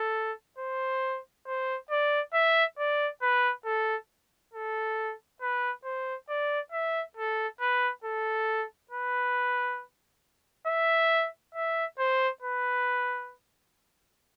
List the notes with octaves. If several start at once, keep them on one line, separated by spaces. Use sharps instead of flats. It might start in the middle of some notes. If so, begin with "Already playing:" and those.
Already playing: A4
C5
C5
D5
E5
D5
B4
A4
A4
B4
C5
D5
E5
A4
B4
A4
B4
E5
E5
C5
B4